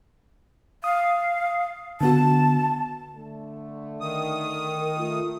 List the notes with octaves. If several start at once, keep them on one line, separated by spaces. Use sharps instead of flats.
F5 D#6
D3 B3 F#4 A5
D3 A3
D#3 D#6
A#4
A3 F4